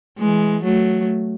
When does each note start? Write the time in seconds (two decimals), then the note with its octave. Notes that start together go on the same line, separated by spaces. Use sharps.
0.18 E3 G#3
0.63 F#3 A3